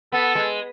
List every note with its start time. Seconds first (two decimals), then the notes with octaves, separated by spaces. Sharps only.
0.12 B3 A4
0.35 G#3